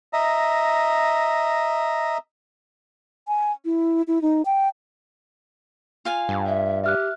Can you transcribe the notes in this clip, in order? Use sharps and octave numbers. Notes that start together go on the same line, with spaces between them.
D#5 E5 A#5
G#5
E4
E4
D#4
G5
F4 F5 G#5
G2
E5
G4 E5 F6 F#6